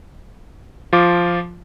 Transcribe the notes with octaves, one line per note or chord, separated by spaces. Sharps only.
F3 F4 D6